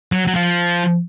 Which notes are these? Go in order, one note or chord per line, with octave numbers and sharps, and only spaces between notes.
F#3
F#3
F3